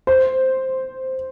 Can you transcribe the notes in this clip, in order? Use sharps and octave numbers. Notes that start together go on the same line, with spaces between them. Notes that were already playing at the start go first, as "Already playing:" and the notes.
C5